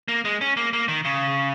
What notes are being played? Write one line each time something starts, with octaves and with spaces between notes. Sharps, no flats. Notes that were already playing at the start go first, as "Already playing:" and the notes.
A#3
G#3
C#4
A#3
A#3
D#3
C#3